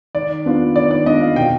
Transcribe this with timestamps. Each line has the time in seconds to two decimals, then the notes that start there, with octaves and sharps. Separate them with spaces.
0.15 D#3 D5
0.46 B3 D4 F4
0.76 D#3 D5
0.91 D5
1.06 B3 D4 F4 D#5
1.21 F5
1.36 B2 G5